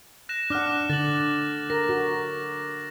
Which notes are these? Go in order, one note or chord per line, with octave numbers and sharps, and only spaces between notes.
F#6 A#6 E7
D4 F#5 D6 F6 F#6
D3 A6 F#7
A#4 A#6
F#4